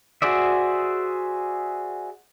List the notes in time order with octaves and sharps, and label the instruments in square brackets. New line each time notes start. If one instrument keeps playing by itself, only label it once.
[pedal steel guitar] F#4 G#4 C5 D5 E5